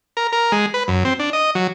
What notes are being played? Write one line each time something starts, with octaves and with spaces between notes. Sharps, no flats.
A#4
A#4
G#3
B4
F#2
C4
D4
D#5
F#3